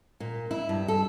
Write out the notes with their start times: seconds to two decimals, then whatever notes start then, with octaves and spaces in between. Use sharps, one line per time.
0.20 A#2
0.51 E4
0.69 G2
0.88 A4